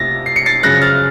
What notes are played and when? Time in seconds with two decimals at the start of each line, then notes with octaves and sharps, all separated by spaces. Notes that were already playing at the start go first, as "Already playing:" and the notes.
Already playing: C3 A6 A#6
0.26 C7
0.36 C#7
0.46 A6 C7
0.63 F#2 C#3 F3 F#6 A#6
0.81 F6 A6